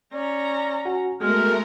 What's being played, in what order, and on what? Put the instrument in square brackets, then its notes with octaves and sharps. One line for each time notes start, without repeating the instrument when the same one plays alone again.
[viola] C#4 A#5 [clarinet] D5
[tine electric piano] F#4 F#5 G#5
[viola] G#3 [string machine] A3 A#4 [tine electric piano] B3 F#4 G#4 [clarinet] F6